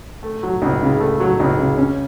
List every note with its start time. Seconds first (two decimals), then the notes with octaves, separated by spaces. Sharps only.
0.23 A3
0.43 F#3
0.62 C#2
0.82 C#3
1.00 A3
1.20 F#3
1.40 C#2
1.58 C#3
1.77 C#4